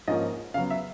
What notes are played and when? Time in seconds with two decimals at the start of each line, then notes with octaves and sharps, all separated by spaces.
0.08 G#2 F3 A#3 C#4 D#5
0.54 C#3 F#3 B3 F5
0.70 E5